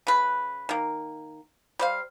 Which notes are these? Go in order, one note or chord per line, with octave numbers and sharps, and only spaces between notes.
C#3 B4
D#3 A#3
G3 C5 F5